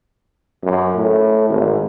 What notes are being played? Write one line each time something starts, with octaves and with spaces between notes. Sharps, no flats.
F#2
A2
G#1